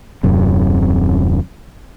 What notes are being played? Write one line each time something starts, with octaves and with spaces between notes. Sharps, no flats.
D#1 F#2 C3